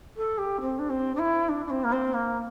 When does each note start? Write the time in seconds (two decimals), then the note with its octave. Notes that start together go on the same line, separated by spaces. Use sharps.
0.16 A4
0.38 G4
0.60 C4
0.79 D4
0.89 C4
1.15 D4
1.19 E4
1.49 D4
1.66 D4
1.70 C4
1.84 A#3
1.92 C4
2.13 A#3